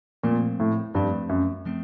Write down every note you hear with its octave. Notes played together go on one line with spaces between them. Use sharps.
A#2 F3 A3 C4
A2
G2 F3 A3 C4
F#2
F3 A3 C4